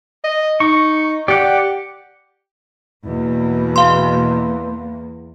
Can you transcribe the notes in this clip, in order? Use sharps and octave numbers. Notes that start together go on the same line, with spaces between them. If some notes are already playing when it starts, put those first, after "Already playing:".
D#5
D#4 C#6
G4 D5 F#5
E2 B2 A#3
F5 C6